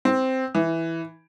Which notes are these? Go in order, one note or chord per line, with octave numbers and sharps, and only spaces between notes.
C4
E3